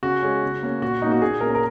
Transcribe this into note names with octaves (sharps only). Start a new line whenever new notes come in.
C#3 F#4
G#3 C#4
C#3
A#3 C#4
A#2 F#4
A#3 C#4 D#4
F#4
A#2 G#4
A#3 C#4 A#4
A#4